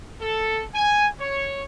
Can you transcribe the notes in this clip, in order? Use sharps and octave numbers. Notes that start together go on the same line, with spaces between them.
A4
G#5
C#5